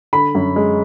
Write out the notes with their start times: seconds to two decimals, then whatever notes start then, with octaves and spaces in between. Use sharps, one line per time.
0.13 D3 B5
0.35 F#2
0.56 G#3